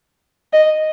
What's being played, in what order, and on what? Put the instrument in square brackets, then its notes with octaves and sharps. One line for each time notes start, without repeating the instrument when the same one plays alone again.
[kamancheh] D#5